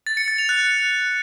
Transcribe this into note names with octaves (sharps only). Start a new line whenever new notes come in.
A6
C#7
A6
F7
F#6